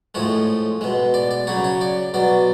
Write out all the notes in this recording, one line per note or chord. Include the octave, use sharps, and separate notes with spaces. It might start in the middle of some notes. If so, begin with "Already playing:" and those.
A2 F3 G#3 C#5
B2 G#3
D5
D5
C#3 F#3 C#5
C#5
D5
B2 F#3 D5